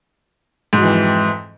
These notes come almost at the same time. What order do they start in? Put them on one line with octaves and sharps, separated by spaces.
G#2 F#3 E3 F2